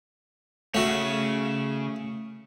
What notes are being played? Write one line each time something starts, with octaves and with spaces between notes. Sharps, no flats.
C#3 A3 C#4 F#4